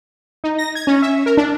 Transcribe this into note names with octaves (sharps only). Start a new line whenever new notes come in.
D#4
A#6
G#6
C#4
E5
A#4
D4